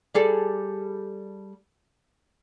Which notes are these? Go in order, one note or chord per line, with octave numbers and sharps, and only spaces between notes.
G3 G#4 A4